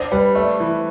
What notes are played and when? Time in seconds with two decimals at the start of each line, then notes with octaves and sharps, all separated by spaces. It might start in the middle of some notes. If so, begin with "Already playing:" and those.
Already playing: D4 C5
0.12 G3 B4
0.35 A3 D5
0.60 E3